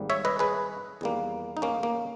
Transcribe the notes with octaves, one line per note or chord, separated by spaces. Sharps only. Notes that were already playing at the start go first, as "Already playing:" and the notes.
Already playing: G#1 G#2 G3 A#3
C#5 E5
B4 D#5
G#4 B4
E2 D#3 G3 A#3
D#4
A#3 C#4
A#3